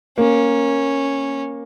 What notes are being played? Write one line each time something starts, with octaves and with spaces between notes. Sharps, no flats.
A#3 C#4